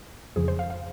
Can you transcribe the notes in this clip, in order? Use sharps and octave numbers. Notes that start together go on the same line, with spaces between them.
F2 C#3 F3 G#4
C5
F5
F5